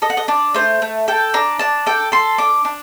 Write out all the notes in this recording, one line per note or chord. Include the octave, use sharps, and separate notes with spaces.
A4 D#5
F#5
D#5
D4 D5
A3 C5
A3
A4 G5
D4 A#5
D4 A5
A4 G5
A4 C6
D4 D6
D4